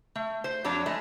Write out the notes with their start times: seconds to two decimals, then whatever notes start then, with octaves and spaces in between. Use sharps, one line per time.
0.16 A3
0.44 C5
0.64 F2 F#3 D4 C#5 A#5
0.86 E3 G#3 A3